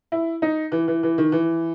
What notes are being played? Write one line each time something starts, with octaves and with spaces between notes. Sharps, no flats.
E4
D#4
E3
E3
E3
D#3
E3